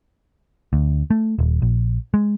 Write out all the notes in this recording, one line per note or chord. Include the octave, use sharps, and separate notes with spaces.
D2
A3
D#1
A#1
G#3